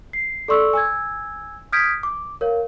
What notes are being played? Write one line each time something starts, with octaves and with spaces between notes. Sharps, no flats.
C7
A4 D5 C6 C#6 E6
G#5 E6 G#6
D#6 F6 G6 G#6 B6 D7
D6
A#4 C#5 F5